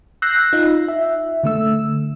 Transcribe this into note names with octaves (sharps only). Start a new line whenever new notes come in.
E6 F#6 G6 A#6 C7
D#4 F4
E5
D3 A3 E6